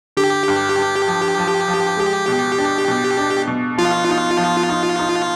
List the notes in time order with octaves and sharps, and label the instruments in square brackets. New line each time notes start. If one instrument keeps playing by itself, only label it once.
[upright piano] D3 [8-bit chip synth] G4
[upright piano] G2
G2
F3
F3
F3
G#3
B2
D4
B2
D4
B2
[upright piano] F3 [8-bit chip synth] F4
[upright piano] D#4
F3
D#4
D#4